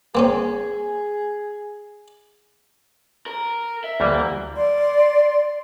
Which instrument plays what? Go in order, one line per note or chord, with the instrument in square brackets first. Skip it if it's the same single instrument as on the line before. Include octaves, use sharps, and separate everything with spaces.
[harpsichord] A#3 C4 C#4 [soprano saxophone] G#4
[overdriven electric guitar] A#4
E5
[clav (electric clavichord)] D2 E3 G3 [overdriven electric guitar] A#3
[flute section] D5 C6